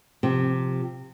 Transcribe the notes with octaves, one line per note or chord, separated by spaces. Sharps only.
C3 F3